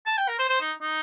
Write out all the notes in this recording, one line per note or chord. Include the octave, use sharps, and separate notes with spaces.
A5
G5
A#4
C5
C5
D#4
D#4